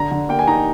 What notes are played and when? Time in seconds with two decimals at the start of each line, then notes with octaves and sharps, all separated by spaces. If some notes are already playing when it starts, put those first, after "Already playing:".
Already playing: D3 A#5
0.11 D3
0.29 A#3 G5
0.39 G#5
0.47 D#4 A#5